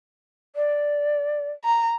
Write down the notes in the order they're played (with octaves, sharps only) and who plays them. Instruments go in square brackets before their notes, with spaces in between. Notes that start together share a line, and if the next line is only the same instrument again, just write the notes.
[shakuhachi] D5
[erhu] A#5